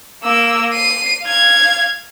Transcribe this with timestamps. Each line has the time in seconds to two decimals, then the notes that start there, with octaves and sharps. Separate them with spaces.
0.23 A#3 E6
0.73 C7 D#7
1.23 F5 G#6